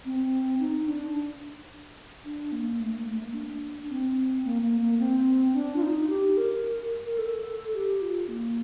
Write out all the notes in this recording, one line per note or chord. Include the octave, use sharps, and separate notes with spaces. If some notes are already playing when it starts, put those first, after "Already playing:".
C4
D#4
D4
D4
A#3
A3
A#3
A3
A#3
D4
C4
A#3
A#3
A#3
C4
D4
F4
D#4
G4
A#4
A#4
A4
G4
F4
A#3